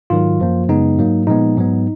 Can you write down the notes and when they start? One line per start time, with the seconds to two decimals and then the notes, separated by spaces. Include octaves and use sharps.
0.10 G#2 D#3 F#3 F4
0.40 F#2 F3 A#3
0.69 F#2 C#3 G#3 B3 D#4
0.98 G#2 F#3 A#3
1.27 A#2 F3 G#3 B3 D#4
1.57 G#2 F#3 B3